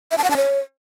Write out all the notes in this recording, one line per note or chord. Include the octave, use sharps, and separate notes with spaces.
E5
A5
F#5
A5
C#5